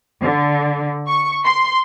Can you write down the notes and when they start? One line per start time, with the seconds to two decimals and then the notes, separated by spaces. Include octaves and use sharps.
0.22 D3
1.08 C#6
1.45 C6